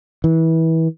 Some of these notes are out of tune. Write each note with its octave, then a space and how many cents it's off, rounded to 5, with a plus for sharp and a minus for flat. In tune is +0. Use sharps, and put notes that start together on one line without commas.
E3 -25